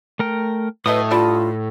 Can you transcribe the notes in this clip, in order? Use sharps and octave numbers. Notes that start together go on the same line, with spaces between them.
A3 A#4 G5
A2 F#3 A3 B4 D#5 D#6
G3 D4 F4 A4